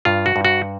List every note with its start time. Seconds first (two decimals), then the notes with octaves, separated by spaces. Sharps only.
0.05 G2 F4
0.26 F#4
0.36 G2
0.45 F#4